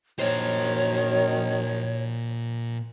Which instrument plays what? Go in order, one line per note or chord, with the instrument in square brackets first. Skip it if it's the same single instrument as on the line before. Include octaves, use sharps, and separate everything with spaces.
[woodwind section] F#2 D#3 [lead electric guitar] A#2 C5 [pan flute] C#5